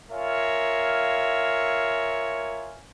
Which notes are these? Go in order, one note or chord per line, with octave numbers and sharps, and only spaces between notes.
F4 A#4 C#5 E5 F5 G#5